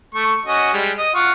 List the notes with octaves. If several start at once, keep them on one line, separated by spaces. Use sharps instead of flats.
A3 C#6
C#4 F#4 D#5
G3 G#3
D#5
F4 F#5 C#6